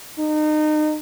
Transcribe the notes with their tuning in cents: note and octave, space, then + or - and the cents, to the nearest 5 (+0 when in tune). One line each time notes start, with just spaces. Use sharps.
D#4 -30